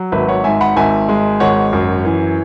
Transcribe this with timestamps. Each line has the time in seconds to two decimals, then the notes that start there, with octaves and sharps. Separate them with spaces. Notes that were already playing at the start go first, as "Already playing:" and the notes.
Already playing: F#3
0.12 G#1 B4 E5
0.28 C#5 F#5
0.44 G#2 E5 G#5
0.61 F#5 B5
0.76 G#1 E5 G#5
1.09 G#3
1.40 G#1 C#5 F#5
1.73 F#2
2.05 E3